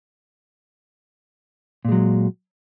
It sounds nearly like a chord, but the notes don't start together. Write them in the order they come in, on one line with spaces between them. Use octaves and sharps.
A#2 G#3 F#3